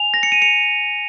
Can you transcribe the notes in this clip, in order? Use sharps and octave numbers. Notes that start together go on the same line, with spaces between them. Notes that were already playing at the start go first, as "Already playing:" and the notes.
Already playing: G#5 F7
A#6
C#7
D#7
C#7 F7